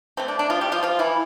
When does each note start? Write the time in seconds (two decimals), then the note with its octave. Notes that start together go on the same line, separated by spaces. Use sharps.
0.17 D3 A3 C4
0.28 D4
0.39 D4
0.50 F3 F4
0.61 G3 G4
0.72 F3 F4
0.83 F3 F4
0.99 E3 E4